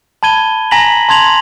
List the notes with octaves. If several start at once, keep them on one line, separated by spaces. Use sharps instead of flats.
A5 B5 G#6 D#7 G7
G#5 A#5 A#6 B6 F#7
A5 C6 G#6 F7 F#7